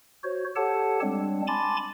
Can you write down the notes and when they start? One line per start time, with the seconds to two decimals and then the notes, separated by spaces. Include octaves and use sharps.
0.24 F#4 C5 C#5
0.56 G4 A4 C#5 F#5 A5
1.01 G3 G#3 C4 D4
1.47 G#5 A5 B5 C6 D6 A6